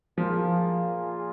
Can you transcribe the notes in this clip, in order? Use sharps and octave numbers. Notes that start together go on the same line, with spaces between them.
A#2 F3 A#3 F4 G#4